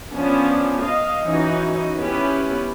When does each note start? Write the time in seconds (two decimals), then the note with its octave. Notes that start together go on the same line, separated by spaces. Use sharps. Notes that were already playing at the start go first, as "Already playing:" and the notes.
0.13 F3 B3 C#4 D4
0.83 D#5 F5
1.26 E3 C#4 D#4 F#4
1.98 B3 C#4 E4 G4 B4